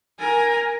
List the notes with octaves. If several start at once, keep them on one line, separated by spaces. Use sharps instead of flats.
A#4 G#5